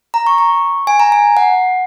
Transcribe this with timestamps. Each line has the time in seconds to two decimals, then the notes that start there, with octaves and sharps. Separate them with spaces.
0.14 A#5
0.27 C#6
0.38 C#6
0.87 G#5
1.00 A#5
1.12 G#5
1.37 F#5